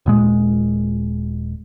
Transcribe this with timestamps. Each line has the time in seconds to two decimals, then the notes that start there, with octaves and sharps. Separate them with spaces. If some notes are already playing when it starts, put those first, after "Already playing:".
0.06 D#1 A#2 G#3